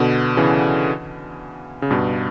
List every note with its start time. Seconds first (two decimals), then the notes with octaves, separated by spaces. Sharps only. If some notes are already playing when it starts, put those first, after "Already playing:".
Already playing: B2 D3
0.37 C#3 E3
1.82 C#3
1.91 G2 B2